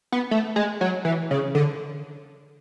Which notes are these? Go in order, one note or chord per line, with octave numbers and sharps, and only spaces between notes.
B3
A3
G#3
F#3
E3
C#3
D3